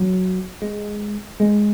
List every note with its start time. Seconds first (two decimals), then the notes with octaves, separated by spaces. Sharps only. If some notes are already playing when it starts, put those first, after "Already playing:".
Already playing: F#3
0.62 G#3
1.40 G#3